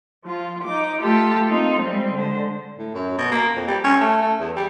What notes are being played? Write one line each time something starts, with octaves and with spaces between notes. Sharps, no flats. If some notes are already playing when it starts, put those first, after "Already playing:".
F3 F4
D#4 D6
A3 F4 G4 A4
A#3 C4 D#4 F4
G3 G#3 C4
D3 G#3 C5
A2
F#2
B2
A#3
F2
G3
C#4
A3
A3
E2
G3